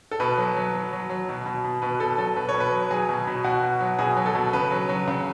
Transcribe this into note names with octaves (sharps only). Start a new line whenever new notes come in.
A4
B2 B4
F#3
F#3
F#3
F#3
F#3
B2
B2
B2
B2 B4
B2 A4
F#3 A4
B2 B4
C#5
B2
B4
F#3
F#3 G#4
B2
B2
B2 F#4
B2
F#3
B2 G#4
F#3
A4
B2
C#3 B4
F#3
F#3
C#3